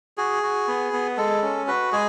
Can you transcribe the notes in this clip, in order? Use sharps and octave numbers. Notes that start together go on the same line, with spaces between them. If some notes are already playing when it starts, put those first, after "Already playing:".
F#4 G#4
F#4
B3
B3
G#3 A4
C#4
F#4 B4
G#3 G#4